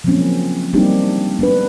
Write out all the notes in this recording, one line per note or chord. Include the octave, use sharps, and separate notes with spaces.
F3 F#3 G#3 A#3 C4 C#4
G3 A#3 C4 D4 D#4 G4
B3 D4 B4